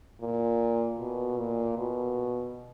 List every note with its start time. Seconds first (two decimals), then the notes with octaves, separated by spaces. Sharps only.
0.21 A#2
1.00 B2
1.38 A#2
1.78 B2